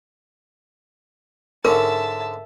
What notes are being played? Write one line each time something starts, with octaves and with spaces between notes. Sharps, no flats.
G#2 D3 C#4 A#4 E5 A5